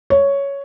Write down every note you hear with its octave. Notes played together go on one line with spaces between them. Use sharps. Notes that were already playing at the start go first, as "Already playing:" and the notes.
C#5